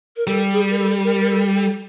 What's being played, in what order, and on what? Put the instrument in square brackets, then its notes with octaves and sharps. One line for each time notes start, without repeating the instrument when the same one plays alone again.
[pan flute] A#4
[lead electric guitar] G3 [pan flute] A4
[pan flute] G#4
A#4
A4
A#4
A#4
A4
A4